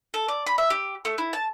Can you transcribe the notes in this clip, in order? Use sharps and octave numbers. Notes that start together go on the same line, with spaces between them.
A4
D5
B5
E5
G4
A3
E4
A5